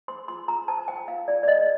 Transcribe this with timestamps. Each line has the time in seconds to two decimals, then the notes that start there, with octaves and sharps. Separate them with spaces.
0.08 C5 C6
0.28 F4 C6
0.48 F4 A#5
0.68 C5 A5
0.88 C5 G5
1.08 F4 F5
1.28 F4 D5
1.43 D5
1.48 C5 D#5
1.61 D#5